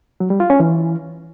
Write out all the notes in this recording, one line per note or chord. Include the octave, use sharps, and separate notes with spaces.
F#3
G3
F4
C#4
E3